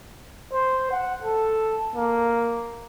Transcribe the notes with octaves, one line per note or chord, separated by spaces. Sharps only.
C5
F#5
A4
A#3